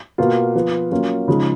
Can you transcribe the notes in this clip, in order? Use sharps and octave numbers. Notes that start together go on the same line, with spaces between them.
B2 A#3 F4
F3 B3 F4
F#3 A#3 C#4 F4
C#3 F3 G#3 D#4